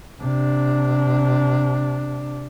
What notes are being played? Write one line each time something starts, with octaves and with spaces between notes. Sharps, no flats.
C3 D4